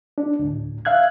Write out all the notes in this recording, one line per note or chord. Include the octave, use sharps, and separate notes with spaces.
D4
D2 A2
E5 F5 F#6 G#6